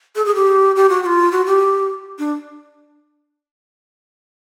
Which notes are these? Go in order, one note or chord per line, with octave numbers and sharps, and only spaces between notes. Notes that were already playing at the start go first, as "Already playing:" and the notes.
A4
G#4
G4
G4
F#4
F#4
F4
F#4
G4
D4